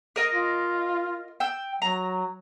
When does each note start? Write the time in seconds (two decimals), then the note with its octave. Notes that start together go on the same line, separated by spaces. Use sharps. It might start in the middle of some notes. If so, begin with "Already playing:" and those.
0.16 A#4 D#5 F5
0.34 F4
1.40 G5 E6
1.82 F#3 A#5